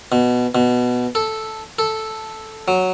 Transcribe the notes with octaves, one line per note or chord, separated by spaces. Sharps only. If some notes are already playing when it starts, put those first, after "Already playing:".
B2
B2
A4
A4
F#3